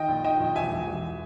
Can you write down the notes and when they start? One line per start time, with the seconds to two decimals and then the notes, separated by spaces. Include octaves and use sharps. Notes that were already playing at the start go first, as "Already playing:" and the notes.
Already playing: D#3 D#5 G5
0.08 A#1
0.24 D#3 D#5 G5
0.40 A#1
0.55 E1 E5 G#5
0.71 E1
0.87 E1